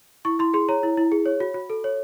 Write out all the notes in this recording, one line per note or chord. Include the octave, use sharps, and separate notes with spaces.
E4 C#6
E4 C6
G#4 C6
C#5 A#5
E4
E4
G#4
C#5
F#4
F#4
A4
C#5